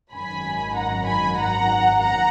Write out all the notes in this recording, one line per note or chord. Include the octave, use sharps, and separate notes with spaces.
G#1 F#2 D#3 F#3 G#5 B5
F#5 A#5
G#5 B5
F#5 A#5
F#5 A#5